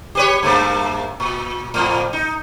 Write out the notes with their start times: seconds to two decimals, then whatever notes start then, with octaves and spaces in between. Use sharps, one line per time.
0.15 G4 B4 C#5
0.43 G2 A3 A#3
1.20 A#2
1.74 F2 A2
2.13 D#4